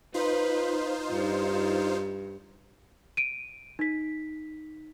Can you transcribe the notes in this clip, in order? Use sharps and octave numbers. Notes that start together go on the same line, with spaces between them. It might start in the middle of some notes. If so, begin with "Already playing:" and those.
D#4 F4 B4 C5
G2
D7 D#7
D#4 B6